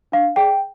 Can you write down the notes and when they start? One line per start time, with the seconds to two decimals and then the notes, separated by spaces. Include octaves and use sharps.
0.12 D4 F5
0.36 G#4 D5 G5